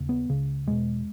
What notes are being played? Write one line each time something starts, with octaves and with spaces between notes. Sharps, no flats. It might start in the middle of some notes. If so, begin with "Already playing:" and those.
Already playing: D#2 C#3
B3
C#2 C#3
E2 B2 G#3